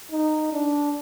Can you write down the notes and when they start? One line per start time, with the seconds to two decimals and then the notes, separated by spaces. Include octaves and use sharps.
0.12 D#4
0.53 D4